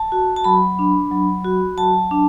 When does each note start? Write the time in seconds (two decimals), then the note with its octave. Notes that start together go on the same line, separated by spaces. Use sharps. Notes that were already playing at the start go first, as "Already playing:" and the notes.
Already playing: A5
0.12 F#4
0.36 A5
0.44 F#3 B5
0.79 D4
1.11 F#3
1.45 F#4
1.78 F#3 A5
2.11 D4